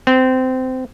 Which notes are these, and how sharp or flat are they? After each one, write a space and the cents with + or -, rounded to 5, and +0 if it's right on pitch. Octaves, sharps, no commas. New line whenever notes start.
C4 -20